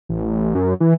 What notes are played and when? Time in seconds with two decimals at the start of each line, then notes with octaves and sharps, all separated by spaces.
0.09 A1
0.55 F#2
0.80 E3